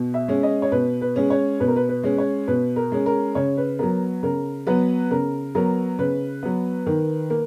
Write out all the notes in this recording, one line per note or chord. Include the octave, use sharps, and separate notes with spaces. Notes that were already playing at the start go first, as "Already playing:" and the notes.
Already playing: B2
E5
G#3 C#4
D#5
C#5
B2 B4
B4
G#3 C#4
C#5
B2 B4
A#4
B4
B4
G#3 C#4
C#5
B2 B4
A#4
G#3 C#4
A#4
C#3 C#5
B4
F#3 B3 A#4
C#3 A#4
F#3 B3 B4
C#3 A#4
F#3 B3 A#4
C#3 B4
F#3 B3
D#3
A#3